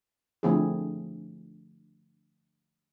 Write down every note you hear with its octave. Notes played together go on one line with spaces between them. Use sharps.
D3 F3 A3 C4 E4 G#4